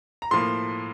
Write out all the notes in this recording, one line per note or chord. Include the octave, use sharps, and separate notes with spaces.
A#5
A2 F3 A#3 C6